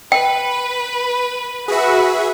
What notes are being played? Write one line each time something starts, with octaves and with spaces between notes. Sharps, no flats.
B4 G5
F#4 G#4 B4 E5